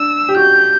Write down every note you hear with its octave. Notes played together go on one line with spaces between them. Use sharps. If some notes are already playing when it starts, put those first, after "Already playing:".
Already playing: D4 E6
G4
F#4 G6